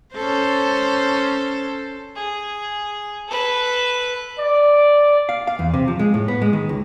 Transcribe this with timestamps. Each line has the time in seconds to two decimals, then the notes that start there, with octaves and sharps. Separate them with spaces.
0.14 C#4 A4 C5
2.16 G#4
3.28 A4 B4
4.39 D5
5.29 F5
5.47 F5
5.59 E2
5.74 C3
5.88 F3
5.99 G#3
6.14 A2
6.28 B3
6.42 G#3
6.53 D#3
6.69 C#2